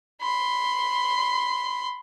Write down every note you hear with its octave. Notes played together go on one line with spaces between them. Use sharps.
B5 C6